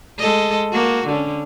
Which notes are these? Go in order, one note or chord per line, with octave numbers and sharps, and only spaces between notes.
G#3 A4 D#5
A#3 F#4
D3 C#4